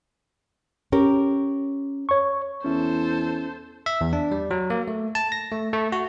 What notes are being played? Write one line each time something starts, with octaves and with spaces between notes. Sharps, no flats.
C#4 G4 A#4
C#5 C#6
E2 C#4 E4 A4 C5
E5
E2
D4
G3
F#3
A#3
A3
A5
A#6
A3
A3
F#4